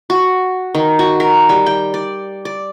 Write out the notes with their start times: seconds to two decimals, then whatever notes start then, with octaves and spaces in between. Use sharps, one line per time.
0.10 F#4
0.75 D#3
0.99 F#4
1.20 A#4
1.49 G3
1.66 G5
1.94 D5
2.45 D5